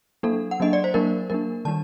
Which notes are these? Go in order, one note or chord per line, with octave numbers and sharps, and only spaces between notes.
F#3 A#3 D4 A4
F#5
F#3 A#3 D4 D#5
D5
C5
F#3 A#3 D4 A#4
F#3 A#3 D4 A#4
D#3 G3 D4 A5